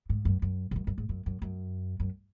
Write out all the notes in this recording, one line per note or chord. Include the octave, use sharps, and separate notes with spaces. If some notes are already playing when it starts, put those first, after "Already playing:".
G#2
F#2
F#2
G#2
F#2
F#2
G#2
F#2
F#2
F#2
F#2